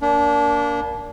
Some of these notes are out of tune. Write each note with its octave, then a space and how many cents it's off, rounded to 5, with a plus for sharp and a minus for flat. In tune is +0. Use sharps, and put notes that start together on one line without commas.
A#3 +5 D4 -30